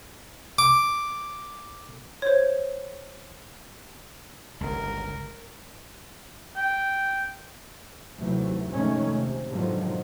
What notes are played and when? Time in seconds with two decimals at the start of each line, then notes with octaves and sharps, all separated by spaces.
0.59 D6
2.22 C5 C#5
4.61 G1 C#2 A#4
6.57 G5
8.17 D#2 C3 E3 F#3 A3
8.69 F1 A2 D#3 G#3 A3 C#4
9.09 C3
9.48 G#2 B2 D3 D#3 F3 F#3